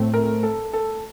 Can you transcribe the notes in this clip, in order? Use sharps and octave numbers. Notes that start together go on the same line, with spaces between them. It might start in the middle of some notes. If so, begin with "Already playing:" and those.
Already playing: A2 A3 C4
A#4
A4
A4